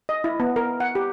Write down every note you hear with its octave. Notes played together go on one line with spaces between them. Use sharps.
D#5
E4
B3
A#4
F#5
G4